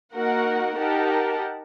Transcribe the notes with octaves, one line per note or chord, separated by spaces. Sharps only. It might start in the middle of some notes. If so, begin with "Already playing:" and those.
A#3 D#4 F#4 A#4 F#5
D#4 G4 A#4 F#5 A5